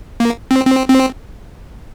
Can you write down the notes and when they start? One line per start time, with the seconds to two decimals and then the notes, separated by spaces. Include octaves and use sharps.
0.20 A#3
0.51 C4
0.66 C4
0.89 C4